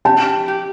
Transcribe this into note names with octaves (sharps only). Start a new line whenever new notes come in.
G4 A5
G4